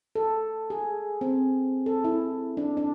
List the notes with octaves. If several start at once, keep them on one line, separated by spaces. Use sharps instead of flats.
A4
G#4
C4
A4
E4
D4
D4